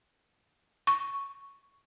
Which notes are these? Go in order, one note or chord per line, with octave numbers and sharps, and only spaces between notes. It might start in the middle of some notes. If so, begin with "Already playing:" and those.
C#6